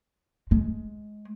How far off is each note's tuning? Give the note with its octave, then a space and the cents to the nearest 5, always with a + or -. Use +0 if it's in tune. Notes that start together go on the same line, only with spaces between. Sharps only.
G#3 +20